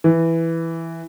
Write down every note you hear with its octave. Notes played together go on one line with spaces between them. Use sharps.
E3